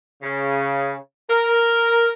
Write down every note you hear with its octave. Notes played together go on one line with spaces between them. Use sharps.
C#3
A#4